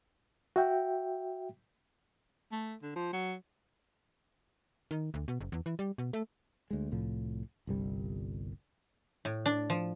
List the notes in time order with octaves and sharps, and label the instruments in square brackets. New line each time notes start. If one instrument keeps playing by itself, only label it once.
[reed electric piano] F#4 E5 G5
[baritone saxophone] A3
D3
F3
F#3
[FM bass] D#3
D2
B2
F#1
E2
E3
G3
B2
A3
[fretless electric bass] D2 G#3
C2 A2 F3
G1 C2 G3
[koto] A2
D4
F3